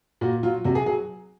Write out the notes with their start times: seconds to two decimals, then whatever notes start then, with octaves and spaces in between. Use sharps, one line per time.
0.21 A#2 F#4
0.43 F#3 F4
0.64 C3 F#4
0.75 G#4
0.86 F#3 G#4